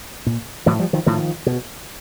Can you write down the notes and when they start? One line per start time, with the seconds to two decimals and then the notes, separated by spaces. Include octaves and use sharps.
0.26 A#2
0.66 A2 E3 F#3
0.79 F3 G3
0.93 D#3 F3
1.06 A2 D#3 F3
1.46 B2